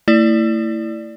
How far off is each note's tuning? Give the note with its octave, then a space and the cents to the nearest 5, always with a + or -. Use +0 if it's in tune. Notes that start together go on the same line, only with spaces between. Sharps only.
A3 +35 E4 +0 D5 +0